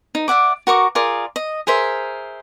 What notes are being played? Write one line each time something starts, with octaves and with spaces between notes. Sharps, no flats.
D#4
D5 E5 F#5 D6
F#4 A#4 C#6 D6
F4 G#4 A#4 D5
D#5
G#4 A#4 C5 E5